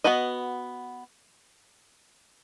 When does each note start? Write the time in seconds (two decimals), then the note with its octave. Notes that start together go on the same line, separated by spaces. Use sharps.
0.04 B3 F#4 B4 D#5